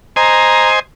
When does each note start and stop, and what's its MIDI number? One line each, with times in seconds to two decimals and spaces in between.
0.16 0.80 72
0.16 0.80 75
0.16 0.80 80
0.16 0.69 82